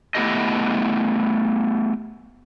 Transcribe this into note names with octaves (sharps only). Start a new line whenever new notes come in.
A3 B3 E4 G4 A4 D#5